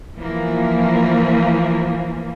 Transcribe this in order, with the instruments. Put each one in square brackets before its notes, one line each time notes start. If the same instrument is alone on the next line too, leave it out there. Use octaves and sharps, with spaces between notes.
[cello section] E3 F3 A#3